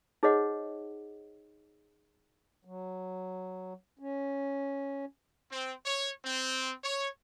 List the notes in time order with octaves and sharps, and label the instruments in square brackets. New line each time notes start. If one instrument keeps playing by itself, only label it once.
[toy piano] D#4 G#4 C5 C#5 D#5 F#5
[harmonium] F#3
C#4
[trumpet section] C4
C#5
C4
C#5